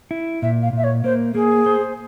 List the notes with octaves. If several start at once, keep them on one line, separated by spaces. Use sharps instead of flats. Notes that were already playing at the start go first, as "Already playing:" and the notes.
E4
A#2 E5
F5
A#2 E5
C#5
A#3 C5
A#3 G#4
C5